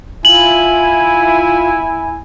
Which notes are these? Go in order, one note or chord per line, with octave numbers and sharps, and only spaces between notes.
E4 F4 G#5 F#7